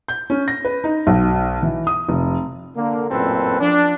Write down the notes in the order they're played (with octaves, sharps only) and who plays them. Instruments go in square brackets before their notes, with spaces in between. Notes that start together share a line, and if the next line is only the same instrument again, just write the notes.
[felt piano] G6
C#4
A#6
B4
D#4
B1
E3
D#6
F1
[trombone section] D3 A#3
A1 F#2 A#2 C4 A4 B4
F3 D4